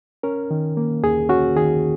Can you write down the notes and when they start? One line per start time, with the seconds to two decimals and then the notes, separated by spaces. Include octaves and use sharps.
0.23 C#4 A#4
0.51 D#3
0.77 A#3
1.03 D#2 G#4
1.29 C#4 F#4
1.56 D#3 G#4